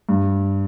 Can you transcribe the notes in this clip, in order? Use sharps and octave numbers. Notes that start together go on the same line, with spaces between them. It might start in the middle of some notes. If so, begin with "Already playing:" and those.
G2